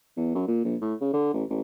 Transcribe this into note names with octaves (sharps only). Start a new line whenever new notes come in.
E2
F#2
A#2
A#1
A2
C#3
D3
A1
A1